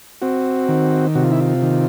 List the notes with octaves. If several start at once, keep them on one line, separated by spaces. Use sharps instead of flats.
C4 F#4
D#3
C3 F#4
F4
E4
F4
D#3